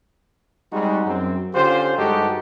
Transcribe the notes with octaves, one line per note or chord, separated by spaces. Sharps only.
G3 G#3 C4 D#4 F#4
F#2 F#3 C4
D3 C#4 F4 G4 C5
G2 G#3 D#4 F#4 G4 A4